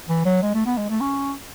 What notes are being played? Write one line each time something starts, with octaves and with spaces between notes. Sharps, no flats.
E3
F#3
G#3
A3
B3
G#3
A3
C#4